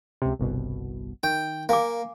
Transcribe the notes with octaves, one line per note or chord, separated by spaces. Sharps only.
C#2 C3
G1 C2 B2
D#3 G5
A#3 F5 G#5 D6